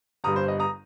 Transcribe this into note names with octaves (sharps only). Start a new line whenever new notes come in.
G1 G2 G3 A#5 D#6
C5
D#5
A#5 D#6